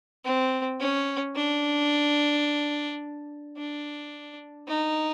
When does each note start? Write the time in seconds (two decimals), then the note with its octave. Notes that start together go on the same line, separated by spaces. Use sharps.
0.25 C4
0.79 C#4
1.35 D4
3.57 D4
4.68 D#4